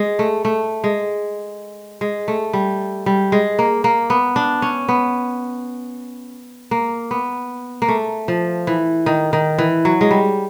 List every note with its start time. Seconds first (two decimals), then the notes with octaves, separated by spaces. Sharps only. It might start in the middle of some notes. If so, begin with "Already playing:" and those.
Already playing: G#3
0.19 A3
0.45 A3
0.84 G#3
2.01 G#3
2.28 A3
2.53 G3
3.06 G3
3.32 G#3
3.59 A#3
3.84 A#3
4.10 B3
4.36 D4
4.62 C#4
4.89 B3
6.71 A#3
7.11 B3
7.82 A#3
7.88 A3
8.28 F3
8.67 E3
9.06 D#3
9.33 D#3
9.59 E3
9.85 F#3
10.01 G#3
10.11 G3